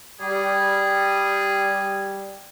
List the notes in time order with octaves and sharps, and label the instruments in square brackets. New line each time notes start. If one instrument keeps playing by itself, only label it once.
[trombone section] G3 [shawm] G#4